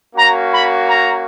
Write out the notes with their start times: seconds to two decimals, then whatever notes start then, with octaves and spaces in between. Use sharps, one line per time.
0.15 A#3 C#4 F#4 A#5
0.51 B5
0.86 A#5